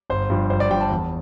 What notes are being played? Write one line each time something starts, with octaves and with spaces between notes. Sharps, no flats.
G1 C5
G2 F3
G1 C5
D5
G2 F3 G5
A5
E2